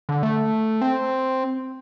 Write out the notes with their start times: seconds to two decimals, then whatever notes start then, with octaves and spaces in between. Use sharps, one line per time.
0.09 D3
0.23 A3
0.81 C4